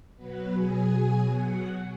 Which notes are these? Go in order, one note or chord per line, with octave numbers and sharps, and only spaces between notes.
B2 F#3 B3 B4
G#4 G#5
F#4 F#5